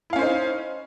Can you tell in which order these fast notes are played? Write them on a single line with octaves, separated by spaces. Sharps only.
E4 F5 C#4 C5 D#4